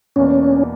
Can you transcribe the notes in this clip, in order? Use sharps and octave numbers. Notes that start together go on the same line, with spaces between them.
E2 B2 A#3 C#4 D4